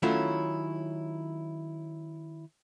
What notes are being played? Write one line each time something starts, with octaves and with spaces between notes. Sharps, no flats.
D#3 F#3 A3 C#4 E4 F4